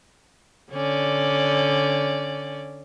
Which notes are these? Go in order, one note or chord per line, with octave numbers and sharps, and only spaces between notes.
D3 C#4 D5